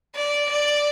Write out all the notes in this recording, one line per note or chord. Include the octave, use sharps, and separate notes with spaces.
D5
D5